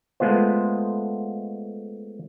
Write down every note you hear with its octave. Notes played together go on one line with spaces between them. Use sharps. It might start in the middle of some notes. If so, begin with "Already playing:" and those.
G#3 A3 B3 F4 C5